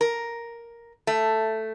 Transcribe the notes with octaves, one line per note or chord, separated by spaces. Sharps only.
A#4
A3